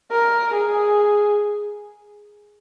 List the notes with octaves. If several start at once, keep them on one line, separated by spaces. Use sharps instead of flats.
A#4
G#4